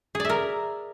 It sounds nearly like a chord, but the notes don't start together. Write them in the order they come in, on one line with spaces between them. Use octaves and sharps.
G#4 D5 E5 A#4